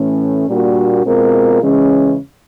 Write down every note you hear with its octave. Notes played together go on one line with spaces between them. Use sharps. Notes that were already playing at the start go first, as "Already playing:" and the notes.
Already playing: A2 E3 A3 C#4
A#2 G3 A#3 D4 F#4
B2 G#3 C4 F4 A#4
C#3 E3 G#3 C#4